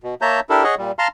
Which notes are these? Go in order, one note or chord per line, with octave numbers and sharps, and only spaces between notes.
B2
A#3 C#5 E5 A5 A#5 G6
D4 E4 G4 A4 A#4
G#4 C#5 D#5 F#5 C#6
A#2 G3
F5 A5 A#5 C6 F6